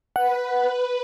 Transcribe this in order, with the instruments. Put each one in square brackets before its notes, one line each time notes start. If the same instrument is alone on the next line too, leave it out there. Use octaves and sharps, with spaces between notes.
[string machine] B4 [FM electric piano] F#5